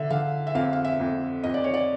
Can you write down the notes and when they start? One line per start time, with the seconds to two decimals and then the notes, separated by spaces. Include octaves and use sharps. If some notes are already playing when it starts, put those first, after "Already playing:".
Already playing: D3 E5
0.10 D3 F5
0.47 E5
0.55 F2 F5
0.73 F5
0.84 E5
1.00 F2
1.44 F2 D#5
1.54 D5
1.64 C#5
1.74 D5